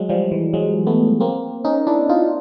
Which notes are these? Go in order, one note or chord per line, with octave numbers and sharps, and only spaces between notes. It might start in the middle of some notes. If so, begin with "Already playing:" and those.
Already playing: F#3 G#3
F3 G3
E3
F#3 G#3
A3 B3
A#3 C4
C#4 D#4
D4 E4
D#4 F4